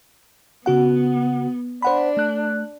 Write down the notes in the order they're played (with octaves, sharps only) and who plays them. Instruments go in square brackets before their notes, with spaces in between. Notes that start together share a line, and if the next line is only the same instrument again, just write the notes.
[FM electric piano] C#3 F#4 F#5 [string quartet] B3
[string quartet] D4 [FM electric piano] C5 F#5 B5
[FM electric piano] A3 F#6